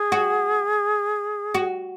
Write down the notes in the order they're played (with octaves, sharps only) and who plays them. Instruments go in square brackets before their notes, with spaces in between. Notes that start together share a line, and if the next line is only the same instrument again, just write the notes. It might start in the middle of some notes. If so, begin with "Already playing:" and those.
Already playing: [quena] G#4
[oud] F#4
F#4